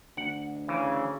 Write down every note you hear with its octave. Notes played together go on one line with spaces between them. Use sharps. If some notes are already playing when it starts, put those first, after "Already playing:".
D2 F#5
C#3 E3